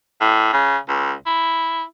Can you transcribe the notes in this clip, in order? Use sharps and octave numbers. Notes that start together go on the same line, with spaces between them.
A2
C#3
C#2
E4